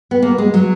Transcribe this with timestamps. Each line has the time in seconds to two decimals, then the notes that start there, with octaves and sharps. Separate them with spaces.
0.11 B3
0.22 A#3
0.38 G#3
0.54 F#3